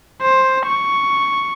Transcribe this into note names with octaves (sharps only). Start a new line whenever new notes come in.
C5
C#6